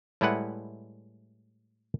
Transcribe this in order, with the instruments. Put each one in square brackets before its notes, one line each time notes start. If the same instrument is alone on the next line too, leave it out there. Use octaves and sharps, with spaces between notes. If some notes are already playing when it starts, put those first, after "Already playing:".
[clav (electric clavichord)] A2 G3 G#3 E4 B4 F#5